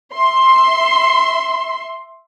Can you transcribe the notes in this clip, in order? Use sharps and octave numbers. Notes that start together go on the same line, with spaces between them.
E5 C6